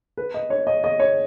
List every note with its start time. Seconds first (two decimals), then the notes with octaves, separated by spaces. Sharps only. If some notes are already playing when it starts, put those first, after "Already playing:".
0.17 B4
0.34 D#5
0.50 C#5
0.67 D#5
0.84 D#5
1.00 C#5